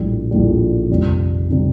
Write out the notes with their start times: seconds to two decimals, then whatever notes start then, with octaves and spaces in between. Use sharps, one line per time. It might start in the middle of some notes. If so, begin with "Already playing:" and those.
Already playing: A#1 A2 G3
0.31 A#1 A2 G3
0.89 F2 C3 G3
1.50 C3 G3